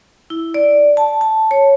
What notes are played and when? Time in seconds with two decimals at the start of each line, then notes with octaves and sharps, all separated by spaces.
0.30 E4
0.54 D5
0.97 A5
1.21 A5
1.51 C#5